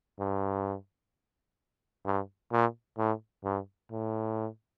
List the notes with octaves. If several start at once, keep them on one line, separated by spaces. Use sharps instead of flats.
G2
G2
A#2
A2
G2
A2